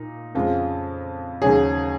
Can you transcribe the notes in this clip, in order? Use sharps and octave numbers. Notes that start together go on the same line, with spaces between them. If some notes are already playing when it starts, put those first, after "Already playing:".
Already playing: A#2 D#4
F2 C#3 G#3 F4
D#2 C#3 F#3 G#4